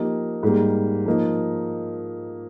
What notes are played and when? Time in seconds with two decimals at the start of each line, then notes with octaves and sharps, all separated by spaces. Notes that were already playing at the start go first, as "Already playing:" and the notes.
Already playing: F3 A#3 D#4 G4
0.43 G#2 G3 A#3
1.06 F3 A#3 D#4